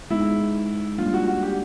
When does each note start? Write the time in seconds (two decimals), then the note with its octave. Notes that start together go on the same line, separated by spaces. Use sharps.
0.10 G#3 B3 D#4 E4
0.98 G3 A#3 D4 F4
1.14 F#4
1.27 F#4
1.43 G4